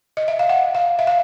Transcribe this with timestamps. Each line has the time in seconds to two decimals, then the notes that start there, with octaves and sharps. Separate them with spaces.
0.17 D#5
0.28 E5
0.39 F5
0.49 F#5
0.75 F5
0.99 E5
1.07 F5